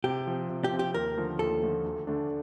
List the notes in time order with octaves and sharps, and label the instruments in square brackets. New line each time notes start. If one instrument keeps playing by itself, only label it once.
[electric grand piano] C3 [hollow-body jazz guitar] G4
[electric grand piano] F3 C4
C3
[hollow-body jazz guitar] G4
[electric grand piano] F3 C4
[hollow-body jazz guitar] G4
[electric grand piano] D#2 [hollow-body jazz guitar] A#4
[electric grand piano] D3 F3 A3
[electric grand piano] D#2 [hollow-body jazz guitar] A4
[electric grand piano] D3 F3 A3
D2
D3 A3 D4